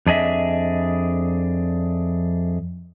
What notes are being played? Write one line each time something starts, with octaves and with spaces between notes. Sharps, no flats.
F2 D4 G#4 D#5 E5